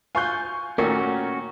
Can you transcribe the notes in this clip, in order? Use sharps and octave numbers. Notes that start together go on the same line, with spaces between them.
F4 G#5 C#6 F#6 G6
A#2 D#3 A3 C#4 F#4 A#4